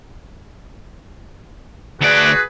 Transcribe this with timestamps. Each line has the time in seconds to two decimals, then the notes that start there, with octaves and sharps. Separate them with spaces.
2.01 D2 F#4 G#4 B4 D5